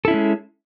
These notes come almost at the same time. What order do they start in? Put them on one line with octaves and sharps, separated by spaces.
A4 E4 C#4 G#3